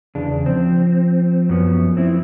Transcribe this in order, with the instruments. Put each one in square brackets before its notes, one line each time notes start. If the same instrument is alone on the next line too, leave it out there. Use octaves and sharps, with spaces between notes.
[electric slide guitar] E2 D4 [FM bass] C#3
[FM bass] F3 [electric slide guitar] C4
[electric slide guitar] F#2 B3
C4 E4